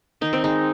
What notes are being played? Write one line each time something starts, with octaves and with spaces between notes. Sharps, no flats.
D#3 D#4
C4
G#3 D#4